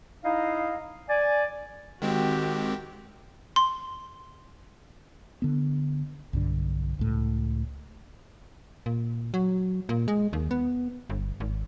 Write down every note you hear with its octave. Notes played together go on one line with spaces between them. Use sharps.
D#4 E4 D#5 F5
D5 G#5
D#3 G#3 C4 F#4 G4
C6
D3 B3
B1 G2 D3
C#2 A2
A#2
F#3
A#2
G#3
D#2
B3
G1
G#1